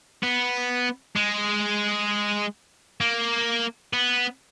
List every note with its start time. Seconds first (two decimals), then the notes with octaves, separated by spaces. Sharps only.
0.23 B3
1.16 G#3
3.01 A#3
3.93 B3